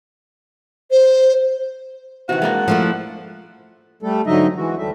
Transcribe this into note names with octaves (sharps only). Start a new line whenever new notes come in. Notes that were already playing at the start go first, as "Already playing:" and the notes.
C5
C3 D#3 E3 F#4 F#5
G#3 A#3 D4 F#4 A#4
F3 A3 E4
G3 A3 A4
G#2 D3 F#3 D#4 D#5 E5
E3 G#3 F#4
D2 G3 A3 E5